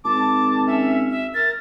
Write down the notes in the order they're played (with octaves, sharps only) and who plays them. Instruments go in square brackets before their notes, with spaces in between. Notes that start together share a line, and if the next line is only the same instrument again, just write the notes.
[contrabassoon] G#1 [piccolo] A5 [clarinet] D6
[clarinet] C#4 [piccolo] E5
[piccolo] E5
[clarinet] A#4 [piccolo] A6